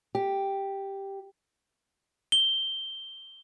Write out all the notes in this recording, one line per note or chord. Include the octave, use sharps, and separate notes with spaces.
G4
G7